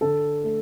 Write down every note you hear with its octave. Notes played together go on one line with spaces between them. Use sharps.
D3 A4
A3